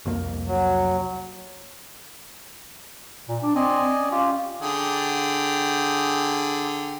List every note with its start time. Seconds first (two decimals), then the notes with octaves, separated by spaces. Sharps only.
0.05 C2 F2 A#3
0.47 F#3
3.29 A#2
3.43 D4
3.55 C4 D5 D#5 G#5
3.98 C#4
4.11 F4 G4
4.61 D3 G#4 G5